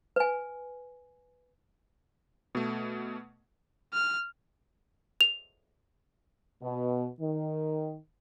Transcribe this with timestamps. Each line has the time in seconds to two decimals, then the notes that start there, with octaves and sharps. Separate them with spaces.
0.16 B4 G#5
2.55 B2 A3
3.93 F6
5.21 F7
6.62 B2
7.20 D#3